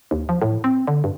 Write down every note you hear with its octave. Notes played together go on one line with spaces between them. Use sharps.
D#2
F3
A2
C4
D3
G2